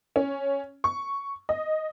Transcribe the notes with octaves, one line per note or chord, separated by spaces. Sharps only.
C#4
C#6
D#5